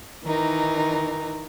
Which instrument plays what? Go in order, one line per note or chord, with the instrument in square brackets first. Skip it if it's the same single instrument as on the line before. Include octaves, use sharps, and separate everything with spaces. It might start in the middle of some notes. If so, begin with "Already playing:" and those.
[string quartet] D#3 E3 D#4 A#4